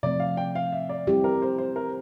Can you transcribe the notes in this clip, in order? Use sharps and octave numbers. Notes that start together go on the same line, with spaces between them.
C3 F3 A3 C4 D5
F5
G5
F5
E5
D5
G3 C4 E4 G4
A#4
C5
C5
A#4